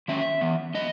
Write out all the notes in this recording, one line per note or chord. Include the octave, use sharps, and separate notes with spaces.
D#3 F#3 C#4 E5
E3 B3
F#3 B3 D#5